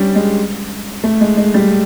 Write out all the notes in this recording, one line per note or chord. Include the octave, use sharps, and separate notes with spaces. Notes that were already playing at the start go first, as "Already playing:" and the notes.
Already playing: G3 C#4 D4
G#3
A3
G#3
G#3
G3